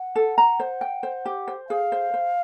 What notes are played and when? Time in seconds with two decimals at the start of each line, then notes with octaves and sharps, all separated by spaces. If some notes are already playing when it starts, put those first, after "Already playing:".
Already playing: F#5
0.16 A4
0.38 A#5
0.60 C5
0.81 G5
1.03 C5
1.25 G4
1.48 C5
1.69 G#4 F5
1.92 C5
2.14 C5